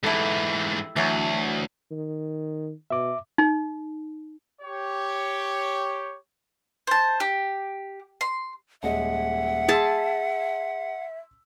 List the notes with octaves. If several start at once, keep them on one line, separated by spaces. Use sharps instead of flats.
G#2 E3 E4 G4 A4
D2 E3 F#3 C#5
D#3
B2 E5 D6
D#4
G4 C#5
C5 A5
G4
C6
D#1 G#3 D#5 E5 F#5
G#4 A5 C6 E6 B6